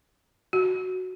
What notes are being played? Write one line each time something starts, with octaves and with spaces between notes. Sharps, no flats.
F#4